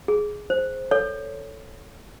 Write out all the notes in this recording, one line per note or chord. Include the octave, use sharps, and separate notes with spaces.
G#4
C5
A4 C#5